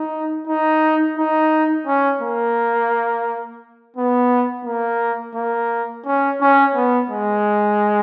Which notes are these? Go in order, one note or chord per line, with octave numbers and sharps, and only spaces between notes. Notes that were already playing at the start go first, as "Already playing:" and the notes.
Already playing: D#4
D#4
D#4
C#4
A#3
B3
A#3
A#3
C#4
C#4
B3
G#3